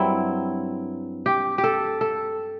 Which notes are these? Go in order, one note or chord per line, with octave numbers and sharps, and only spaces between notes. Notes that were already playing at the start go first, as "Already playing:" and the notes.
Already playing: G2 F#3 C4 E4
G4
G4
A4
A4